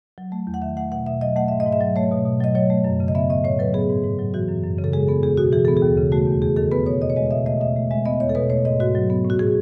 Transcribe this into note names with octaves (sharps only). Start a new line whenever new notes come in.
F#3
A3
E2
F#5
D#3 E5
A3 F#5
B2 F#5
B2 E5
F#3 D#5
A3 F#5
G#2 E5
D#5
G#2
E5
F#3
A3 C#5
B2
B2
F#3 D#5
F#3 C#5
A3
F#2
C#3
D#5
B3 E5
A2 D#5
A2 C#5
F#3 B4
B3 G#4
G#2
G#2
F#3
E3 F#4
F#2
F#2
C#3
A4
G#3 G#4
B3 A4
E2 G#4
B2 F#4
E3 G#4
B3 A4
G#4
D#2
C#3
A3 F#4
E2
E2 G#4
D#3 A4
B3 B4
B2 C#5
B2 D#5
C#5
G#3 D#5
B2 E5
A3 D#5
B2 E5
A3
G#3 E5
B3 D#5
E2 C#5
A4
B2 B4
A3 C#5
G#2 D#5
G#2 F#4
F#3
B3
A2
F#4
A2 G#4